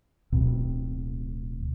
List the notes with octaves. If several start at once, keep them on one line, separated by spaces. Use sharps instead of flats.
D1 D2 B2 C4